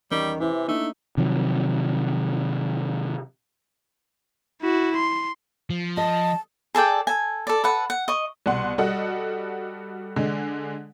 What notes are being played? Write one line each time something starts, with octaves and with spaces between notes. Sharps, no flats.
E2 D#3 G3 C#4
C3 E3 E4
A3 A#3 D4 D#4
C3 D#3 F3 F#3
E4 F#4
C6
F3
D#5 A5
G#4 A4 D5 G5
A4 G#5
A4 D5
A4 B4 F#5
F#5
D#5 C#6
C2 B2 F#5 C6
G3 F#4 A4 D#5 F#5
D3 G#3